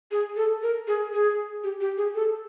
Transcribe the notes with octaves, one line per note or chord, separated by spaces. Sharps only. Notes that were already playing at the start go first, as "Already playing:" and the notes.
G#4
A4
A#4
G#4
G#4
G4
G4
G#4
A4